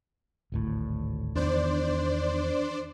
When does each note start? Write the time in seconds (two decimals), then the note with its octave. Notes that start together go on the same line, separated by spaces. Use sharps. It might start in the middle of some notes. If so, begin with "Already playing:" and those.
0.52 G#1 D2 A2
1.35 E2 D#3 B3 D4 C5 D5